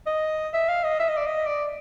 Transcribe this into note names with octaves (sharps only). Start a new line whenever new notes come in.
D#5
E5
F5
D#5
E5
D#5
D5
D#5
D5